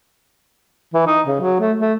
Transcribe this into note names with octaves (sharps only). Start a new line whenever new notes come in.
E3
D#4
C#3
F#3
A3
A3